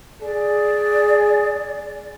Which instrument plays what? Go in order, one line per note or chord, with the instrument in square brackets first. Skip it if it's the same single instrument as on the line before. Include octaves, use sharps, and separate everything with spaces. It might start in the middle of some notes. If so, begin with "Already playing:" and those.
[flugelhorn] G#4 [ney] D5